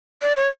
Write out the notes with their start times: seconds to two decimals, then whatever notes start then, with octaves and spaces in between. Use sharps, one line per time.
0.22 D5
0.37 C#5